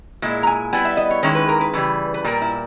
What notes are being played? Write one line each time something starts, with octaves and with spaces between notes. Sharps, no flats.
A#2 G#3 E4
A#5
G#5
G3 B3 E4 G#5
E5
D#5
C#5
D#3 G#3 C#4 E4 C#5
B4
A#4
B4
C#3 E3 G3
B4
A#2 G3 A#3 A#4
E4